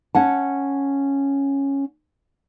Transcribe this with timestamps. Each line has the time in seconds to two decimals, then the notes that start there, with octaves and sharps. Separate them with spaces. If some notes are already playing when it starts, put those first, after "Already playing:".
0.15 C#4 F#5 A5